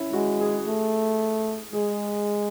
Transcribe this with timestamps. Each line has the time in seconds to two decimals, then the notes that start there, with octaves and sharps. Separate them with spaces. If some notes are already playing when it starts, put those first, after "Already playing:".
Already playing: C#4 E4
0.13 G#3 F#4
0.40 G#4
0.66 A3
1.73 G#3 G#4